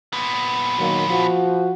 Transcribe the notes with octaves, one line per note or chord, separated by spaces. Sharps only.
A#2 B3
D#3 F#3 A#3
F3 F#4